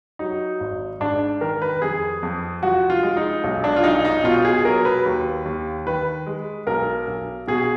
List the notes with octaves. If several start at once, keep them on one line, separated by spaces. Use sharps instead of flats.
F#3 D#4
G#1
G#2 D4
D#3 A#4
B4
F2 G#4
F2
F3 F#4
F4
G#3
D#4
B1
D4
F4
B1 D#4
D#4
B2 F4
G#4
F#3 A#4
B4
D#2
D#2
D#3 B4
G#3
B1 A#4
B1
B2 G#4